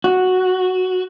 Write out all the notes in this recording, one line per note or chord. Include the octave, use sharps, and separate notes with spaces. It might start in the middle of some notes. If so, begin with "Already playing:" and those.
F#4